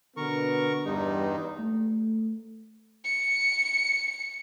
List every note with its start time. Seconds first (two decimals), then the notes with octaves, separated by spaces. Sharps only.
0.17 B2 D3 B3 A#4 C#6
0.85 E2 G2 G3 D#4
1.59 A3
3.04 C#7